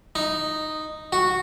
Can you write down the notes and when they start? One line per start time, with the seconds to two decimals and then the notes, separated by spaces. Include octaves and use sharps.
0.15 D#4
1.12 F#4